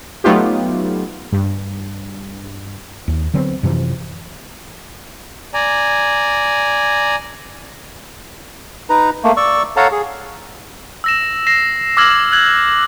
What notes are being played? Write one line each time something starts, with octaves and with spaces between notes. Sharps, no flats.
F#3 A3 B3 D#4 F4 G4
G2
D#2
D3 F#3 B3 C4
F#2 C3 E3 F3
D5 G#5 A#5
D#4 B4 A#5
A3 A#3
D5 C#6 E6
A4 C#5 F5 F#5 A5 A#5
G#4
E6 A#6 E7
A#6 C7 E7
D6 E6 F6 G#6 A#6 F#7
F#6 G#6 F#7